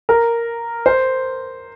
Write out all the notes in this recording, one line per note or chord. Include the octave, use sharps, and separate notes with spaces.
A#4
C5